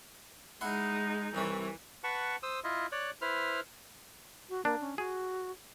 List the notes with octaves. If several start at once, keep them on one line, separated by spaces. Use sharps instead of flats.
G#3 D#4 E4 F#5 C6
C2 C3 E3 C#5
B4 F#5 A5 C#6
C5 D#6 E6
E4 F4 D#5
C#5 D5 F#6
E4 B4 C5 F6
F#4
A#3 D4
C#4
F#4 G#4